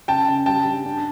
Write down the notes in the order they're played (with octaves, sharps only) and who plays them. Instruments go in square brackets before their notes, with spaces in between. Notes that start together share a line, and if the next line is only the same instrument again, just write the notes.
[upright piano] C#3 [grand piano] G5 A5
[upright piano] C#3
[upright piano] G3 [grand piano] G5 A5
[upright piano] G2
D4